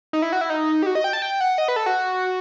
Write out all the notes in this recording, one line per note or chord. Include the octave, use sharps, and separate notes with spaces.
D#4
E4
F#4
E4
D#4
G4
F#4
D#5
G5
A5
G5
F#5
D#5
B4
A4
F#4